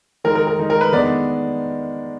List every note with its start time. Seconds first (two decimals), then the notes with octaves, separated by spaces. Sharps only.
0.24 D#3 G#3 D#4 A#4
0.35 A#4
0.47 A#4
0.58 D#3 G#3 D#4
0.70 A#4
0.81 B4
0.92 D#3 G#3 B3 D4 D5